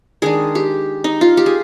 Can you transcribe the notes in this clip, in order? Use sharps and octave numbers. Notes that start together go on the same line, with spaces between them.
D#3 G#3 D4 G#4
G4
D#4
F4
G4
G#4